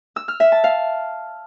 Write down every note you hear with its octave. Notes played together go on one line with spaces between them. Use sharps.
E6
F6
E5
A5
F5